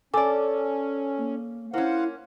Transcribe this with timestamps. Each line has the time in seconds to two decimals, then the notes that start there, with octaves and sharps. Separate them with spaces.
0.14 C#4 A4 D5 G#5 D6
1.18 A#3
1.74 A#3 C#4 E4 C5 F5 F#5